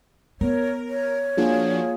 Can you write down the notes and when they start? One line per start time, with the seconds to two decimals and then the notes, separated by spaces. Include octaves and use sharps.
0.41 B3 A#4 C#5
0.88 C#5
1.37 F3 A#3 D4 F4 F#4 G#4